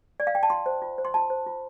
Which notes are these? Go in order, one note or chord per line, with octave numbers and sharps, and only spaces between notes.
D5
F5
G5
A5
F4 C6
C5
F4
C5
C6
F4 A5
C5
F4